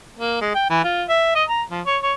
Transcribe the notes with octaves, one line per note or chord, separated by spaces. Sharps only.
A#3
G#3
G5
E3
F4
E5
D#5
A#5
F3
C#5
C#5